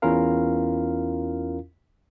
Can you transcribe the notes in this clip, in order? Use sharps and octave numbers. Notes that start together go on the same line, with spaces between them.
E2 C#4 E4 F4 A#4 F5